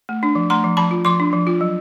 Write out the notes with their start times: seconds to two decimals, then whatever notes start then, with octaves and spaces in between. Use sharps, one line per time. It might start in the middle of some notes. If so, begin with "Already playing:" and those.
0.09 A3
0.23 D4
0.35 F3
0.50 A3 A#5 C6
0.64 F3
0.77 F3 A5 B5
0.91 F4
1.05 F3 C6 D6
1.20 D4
1.33 F3
1.47 F4
1.61 F#3